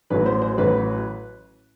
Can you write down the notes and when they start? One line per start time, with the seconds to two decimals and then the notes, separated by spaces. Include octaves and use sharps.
0.10 A1 A2 F#3 B4
0.26 C5
0.42 C5
0.58 A1 A2 F#3 B4